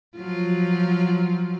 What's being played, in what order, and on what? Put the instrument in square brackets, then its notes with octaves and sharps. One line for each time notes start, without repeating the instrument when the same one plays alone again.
[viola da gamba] F3 F#3 F4